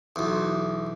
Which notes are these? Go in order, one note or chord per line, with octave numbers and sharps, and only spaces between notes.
B1 E2